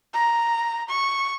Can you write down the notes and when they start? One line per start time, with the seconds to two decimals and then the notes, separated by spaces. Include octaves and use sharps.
0.14 A#5
0.89 C#6